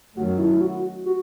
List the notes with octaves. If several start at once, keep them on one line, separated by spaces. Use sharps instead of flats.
F#2 D#3 F#3 A3 F#4
E4
F#4
F#4